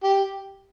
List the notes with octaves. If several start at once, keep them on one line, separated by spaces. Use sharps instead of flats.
G4